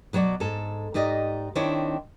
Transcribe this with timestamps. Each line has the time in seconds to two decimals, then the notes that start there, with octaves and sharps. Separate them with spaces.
0.13 B2 F#3 F#4 C5 D5
0.40 G#2 A4
0.94 G#2 D#4 G4 D5 D#5
1.55 D#3 C4 D4 E4 C#5